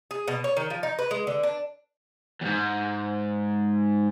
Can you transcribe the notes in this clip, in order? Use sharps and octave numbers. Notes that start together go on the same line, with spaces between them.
G#4
B2
C#5
D#3
F3
D#4
B4
G#3
D3
D4
E2 G#2